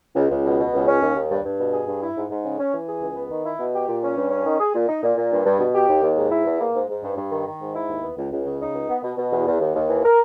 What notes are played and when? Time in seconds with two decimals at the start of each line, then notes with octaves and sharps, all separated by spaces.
0.16 C#2
0.31 C#2
0.45 B2
0.60 B2
0.74 C#2
0.88 C#4
1.02 D#2
1.16 D#2
1.31 G2
1.46 G2
1.59 B2
1.73 G#4
1.88 G2
2.02 E4
2.17 G#2
2.30 G#2
2.45 C#3
2.59 C#4
2.74 E3
2.89 G#4
3.02 C#2
3.16 B3
3.31 D#3
3.45 E4
3.59 B2
3.74 G4
3.88 A#2
4.03 C#4
4.17 G2
4.31 C#4
4.45 D#3
4.60 G#4
4.75 A#2
4.89 D#4
5.03 A#2
5.18 A#2
5.32 G2
5.46 G2
5.60 B2
5.75 G4
5.88 D#2
6.03 D#2
6.17 G#2
6.32 E4
6.46 E2
6.60 A#3
6.75 G#2
6.89 G#2
7.04 G2
7.17 G2
7.32 D#3
7.47 D#3
7.61 G#2
7.75 E4
7.90 D#2
8.03 B3
8.17 C#2
8.32 C#2
8.46 C#3
8.61 D#4
8.75 C#2
8.89 B3
9.03 B2
9.18 B2
9.32 E2
9.47 E2
9.61 D#2
9.75 D#2
9.89 E3
10.05 A#4